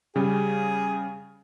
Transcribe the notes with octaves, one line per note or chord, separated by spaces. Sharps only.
C#3 G3 G#4